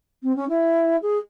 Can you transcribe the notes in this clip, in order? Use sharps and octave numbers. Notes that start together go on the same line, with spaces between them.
C4
C#4
E4
G#4